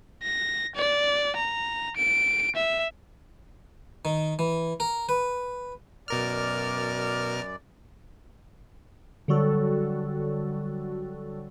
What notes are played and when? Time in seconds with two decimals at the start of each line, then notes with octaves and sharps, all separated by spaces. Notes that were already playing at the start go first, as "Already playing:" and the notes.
0.23 A#6
0.76 D5
1.36 A#5
1.97 D7
2.56 E5
4.05 D#3
4.39 E3
4.80 A#4
5.09 B4
6.08 F#2 B2 A#4 D5 F6
9.28 D3 F#3 G3 F#4 A4